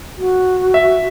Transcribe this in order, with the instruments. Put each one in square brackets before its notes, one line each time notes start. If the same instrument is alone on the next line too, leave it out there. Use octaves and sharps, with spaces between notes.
[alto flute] F#4
[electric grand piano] E5